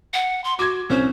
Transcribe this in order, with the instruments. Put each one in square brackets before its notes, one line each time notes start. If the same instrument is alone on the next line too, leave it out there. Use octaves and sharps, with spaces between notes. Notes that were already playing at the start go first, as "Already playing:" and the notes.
[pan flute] F#5
C6
[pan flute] F#4 [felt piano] D6 G#6
[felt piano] C2 C#4 [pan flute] C5